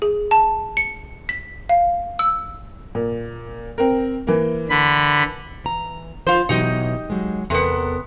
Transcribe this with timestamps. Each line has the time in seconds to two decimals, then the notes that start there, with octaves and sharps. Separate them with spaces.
0.02 G#4
0.31 A5
0.77 C#7
1.29 B6
1.69 F5
2.19 E6
2.95 A#2
3.78 C4 A#4
4.27 E3 A#3
4.69 D3 B5
5.64 E3 A#5
6.27 F3 F4 C5
6.49 B2 E3 F#3 D#4 G4 D#5
7.10 F#3 G#3
7.50 E2 C3 B3 A4 A#4